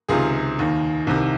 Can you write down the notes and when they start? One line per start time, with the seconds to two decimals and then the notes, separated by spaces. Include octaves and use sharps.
0.08 C#2 C3 D#3 F4 G#4
0.59 D#2 D#3
1.07 C2 C3 D#3